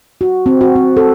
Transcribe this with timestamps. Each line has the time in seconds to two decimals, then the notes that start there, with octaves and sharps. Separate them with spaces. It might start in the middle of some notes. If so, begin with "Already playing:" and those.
0.21 F#4
0.46 C4
0.61 F#4
0.75 C4
0.97 A4